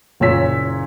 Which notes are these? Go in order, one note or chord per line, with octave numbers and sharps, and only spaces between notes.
F#1 A#2 C#5 E6 B6